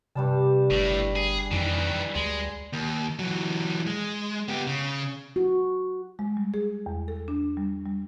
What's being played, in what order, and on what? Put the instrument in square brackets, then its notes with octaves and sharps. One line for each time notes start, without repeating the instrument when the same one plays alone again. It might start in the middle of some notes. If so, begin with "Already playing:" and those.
[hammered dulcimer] G2 G3 A5 [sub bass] C3
[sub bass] G1 [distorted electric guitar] A2
[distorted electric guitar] G#4
[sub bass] F2 [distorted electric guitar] D#3 E3
[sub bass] D2 [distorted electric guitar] G#3
[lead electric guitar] D#2
E3 F#3
G#3
B3 G4
C#3
[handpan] F#4
[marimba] G#3
G3
G#4
E2
A4
D4
G3
G3